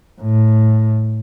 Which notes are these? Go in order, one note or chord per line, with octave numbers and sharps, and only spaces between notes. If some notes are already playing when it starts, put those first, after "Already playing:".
A2